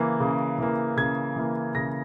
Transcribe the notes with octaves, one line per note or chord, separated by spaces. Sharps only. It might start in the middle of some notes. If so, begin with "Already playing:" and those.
Already playing: C#3 E3 A#3
C#3
E3 A#3
C#3 G#6
E3 A#3
C#3 A#6